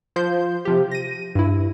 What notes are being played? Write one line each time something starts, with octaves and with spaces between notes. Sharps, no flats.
F3 C5 G6
C3 F3 G4
A#6 D#7
G2 E4